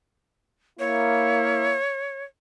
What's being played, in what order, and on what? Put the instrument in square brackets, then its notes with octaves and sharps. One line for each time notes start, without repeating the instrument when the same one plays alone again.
[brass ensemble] A#3 E4 [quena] C#5